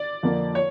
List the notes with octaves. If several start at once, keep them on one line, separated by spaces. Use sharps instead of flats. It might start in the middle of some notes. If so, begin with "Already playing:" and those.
Already playing: D5
F2 D3 F3 A#3
C#5